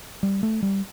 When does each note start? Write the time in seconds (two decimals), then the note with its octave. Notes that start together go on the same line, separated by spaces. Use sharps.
0.23 G3
0.43 A3
0.63 G3